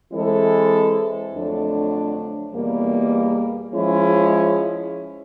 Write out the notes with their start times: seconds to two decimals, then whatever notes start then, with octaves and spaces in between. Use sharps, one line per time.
0.13 E3 G#3 C4 E4 A4
1.34 F2 D3 F#3 A3 D4
2.54 E2 B2 G3 A#3
3.75 F3 G#3 C#4 E4 G#4